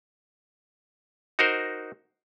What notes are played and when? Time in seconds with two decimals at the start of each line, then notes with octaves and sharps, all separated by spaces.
1.39 D#4 F#4 A#4 C5